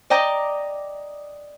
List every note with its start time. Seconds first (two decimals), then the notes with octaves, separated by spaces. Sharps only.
0.10 D5 D#5 G5 A#5 D6